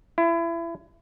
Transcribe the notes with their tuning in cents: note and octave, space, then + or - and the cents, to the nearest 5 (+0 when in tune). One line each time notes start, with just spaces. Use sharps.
E4 +30